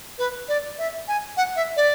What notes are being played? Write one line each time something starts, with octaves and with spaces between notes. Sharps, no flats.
B4
D5
E5
G#5
F#5
E5
D5